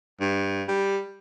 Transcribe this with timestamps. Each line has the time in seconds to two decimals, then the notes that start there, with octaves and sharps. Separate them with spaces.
0.21 G2
0.68 G3